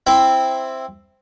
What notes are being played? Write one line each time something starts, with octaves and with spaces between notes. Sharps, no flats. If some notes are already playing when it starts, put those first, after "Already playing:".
C4 E4